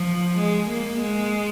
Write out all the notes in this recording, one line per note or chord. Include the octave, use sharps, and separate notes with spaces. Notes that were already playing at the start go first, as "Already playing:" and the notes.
Already playing: F3
G#3
A#3
G#3